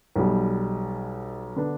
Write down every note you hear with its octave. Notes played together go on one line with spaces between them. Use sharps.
B1 B2 G3
D3 B3 D4